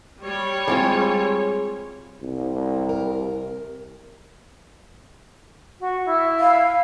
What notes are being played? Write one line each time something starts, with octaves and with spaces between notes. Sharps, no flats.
G3 C#5
G#3 C4 F4 G#4
C2
A#4
F#4
E4
F5